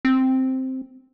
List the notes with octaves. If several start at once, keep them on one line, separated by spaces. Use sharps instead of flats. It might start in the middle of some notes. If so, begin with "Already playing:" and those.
C4